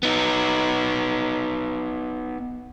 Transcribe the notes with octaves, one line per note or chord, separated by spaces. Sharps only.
B3 D#4